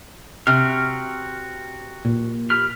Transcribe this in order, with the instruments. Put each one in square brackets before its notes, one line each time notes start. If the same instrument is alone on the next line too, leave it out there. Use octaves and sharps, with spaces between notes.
[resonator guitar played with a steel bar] C3 [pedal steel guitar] F#4 G5 F6
[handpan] A#2
[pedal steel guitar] G4 B5 F6